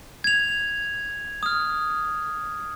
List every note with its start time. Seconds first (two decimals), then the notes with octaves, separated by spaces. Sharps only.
0.24 G#6 F7
1.43 D#6 F6